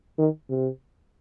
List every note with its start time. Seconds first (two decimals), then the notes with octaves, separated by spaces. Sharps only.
0.18 D#3
0.49 C3